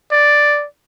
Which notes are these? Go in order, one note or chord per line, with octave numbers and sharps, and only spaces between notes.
D5